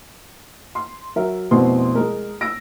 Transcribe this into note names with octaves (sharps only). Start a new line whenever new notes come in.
C6
F#3 A#4 E5
F1 C2 B2 C4 C6
G#3 A#4
E6 A#6 D7